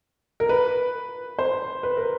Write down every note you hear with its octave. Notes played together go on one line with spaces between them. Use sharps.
A#4
B4
C5
B4
A#4